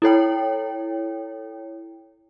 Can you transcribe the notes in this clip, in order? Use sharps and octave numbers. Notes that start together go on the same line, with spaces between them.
E4 A4 C#5 G5